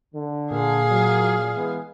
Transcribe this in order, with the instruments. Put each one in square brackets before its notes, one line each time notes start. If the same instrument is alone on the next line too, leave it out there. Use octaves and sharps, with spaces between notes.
[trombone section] D3
[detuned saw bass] A#2 [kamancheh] G#4 F5
[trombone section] F#3
E3 G#3 B3